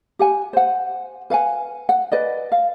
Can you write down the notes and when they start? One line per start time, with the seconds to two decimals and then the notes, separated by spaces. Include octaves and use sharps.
0.19 G4 F#5 G#5
0.53 C5 F#5
1.30 B4 F5 F#5 G#5
1.89 F#5
2.12 B4 D5 D#5
2.52 F5